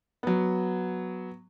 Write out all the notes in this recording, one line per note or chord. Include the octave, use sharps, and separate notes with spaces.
F#3 B3